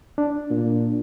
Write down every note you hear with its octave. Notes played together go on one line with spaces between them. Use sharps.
D4
A#2